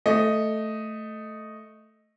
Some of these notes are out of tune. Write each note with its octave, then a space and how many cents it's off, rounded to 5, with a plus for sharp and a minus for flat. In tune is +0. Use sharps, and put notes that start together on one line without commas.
A3 +0 D#5 +0